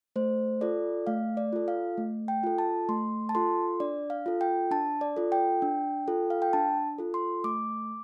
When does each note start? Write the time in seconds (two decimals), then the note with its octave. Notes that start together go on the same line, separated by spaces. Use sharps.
0.16 A3 C5
0.61 F4 A4 D5
1.07 A3 F5
1.37 D5
1.53 F4 A4
1.68 F5
1.98 A3
2.28 G5
2.43 F4 A4
2.58 A5
2.89 A3 C6
3.29 A5
3.35 F4 A4 C6
3.80 D4 D5
4.10 F5
4.26 F4 A4
4.41 G5
4.71 D4 A5
5.01 D5
5.17 F4 A4
5.32 G5
5.62 D4
6.08 F4 A4
6.30 F5
6.42 G5
6.53 D4 A5
6.98 F4 A4
7.14 C6
7.44 A3 D6